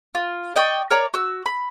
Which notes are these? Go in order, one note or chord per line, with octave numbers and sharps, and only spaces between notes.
F4
D5 D#5 G5 C#6
A#4 C#5 D5 A#5
F#4 E6
B5